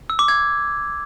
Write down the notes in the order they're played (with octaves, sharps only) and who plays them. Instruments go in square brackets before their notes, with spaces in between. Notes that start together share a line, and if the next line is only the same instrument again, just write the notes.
[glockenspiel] E6
D6
G#6